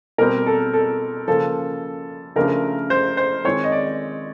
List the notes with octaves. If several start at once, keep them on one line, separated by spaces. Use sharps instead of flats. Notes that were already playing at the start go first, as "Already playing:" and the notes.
B2 G3 C4 A#4
A4
A4
C#3 F3 A#3 A4
C#3 F3 A3 D4 A#4
C5
C5
D#3 G#3 C4 C#5
D#5
D5